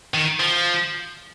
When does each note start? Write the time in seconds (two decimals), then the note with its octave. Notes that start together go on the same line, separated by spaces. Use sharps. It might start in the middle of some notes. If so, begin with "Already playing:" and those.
0.14 D#3
0.40 F3